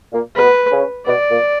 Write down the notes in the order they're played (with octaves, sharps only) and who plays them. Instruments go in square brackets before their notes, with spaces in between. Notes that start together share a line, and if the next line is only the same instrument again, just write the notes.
[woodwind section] A#2 A#3
[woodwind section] B2 B3 [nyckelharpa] B4
[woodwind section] C#3 C#4
[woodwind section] B2 B3 [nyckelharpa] D5
[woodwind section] A#2 A#3